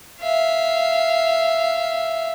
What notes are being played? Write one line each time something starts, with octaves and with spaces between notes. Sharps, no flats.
E5 F5